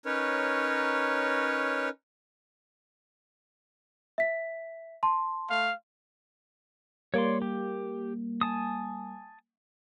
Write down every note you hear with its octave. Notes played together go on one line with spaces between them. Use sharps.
C#4 D#4 A#4 B4 C#5
E5 B6
A5 C6
A3 F5
G3 A#3 C#5 D5 C6
G4
G#5 A5 D#6